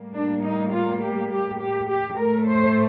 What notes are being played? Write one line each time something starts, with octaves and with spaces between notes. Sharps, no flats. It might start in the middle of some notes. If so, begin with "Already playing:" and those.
Already playing: A2 G3 A#3
D4
D#4
F4
G4
G4
G4
G4
A2 A3 A#4
C5